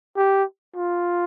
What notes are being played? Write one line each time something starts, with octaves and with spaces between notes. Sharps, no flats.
G4
F4